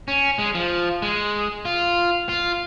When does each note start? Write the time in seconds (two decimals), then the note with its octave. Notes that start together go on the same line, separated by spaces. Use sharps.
0.08 C#4
0.39 G#3
0.55 F3
1.02 G#3
1.65 F4
2.29 F4